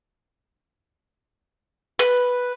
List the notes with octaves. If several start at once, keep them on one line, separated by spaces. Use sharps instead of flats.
B4